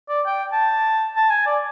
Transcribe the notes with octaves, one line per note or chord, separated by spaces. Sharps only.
D5
G5
A5
A5
G#5
D5